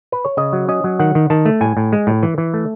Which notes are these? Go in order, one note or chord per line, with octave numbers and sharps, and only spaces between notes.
B4
C#5
C#3 D#5
F#3
C#4 D#5
F#3
D#3 F#5
D#3
D#3 A5
A3
A2 G#5
A2
G#3
A2
E3
E3
A3